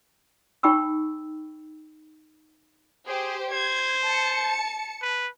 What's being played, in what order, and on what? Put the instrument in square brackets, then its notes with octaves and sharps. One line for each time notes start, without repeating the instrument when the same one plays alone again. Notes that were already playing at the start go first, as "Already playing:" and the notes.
[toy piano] D#4 G5 B5 C#6 E6
[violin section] G4 C5 [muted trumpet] G#4
[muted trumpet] C5 [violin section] G#6
[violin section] A5 C#7
[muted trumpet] B4